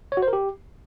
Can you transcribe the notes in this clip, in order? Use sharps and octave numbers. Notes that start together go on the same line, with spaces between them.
C#5
F#4
C5
A#4
G4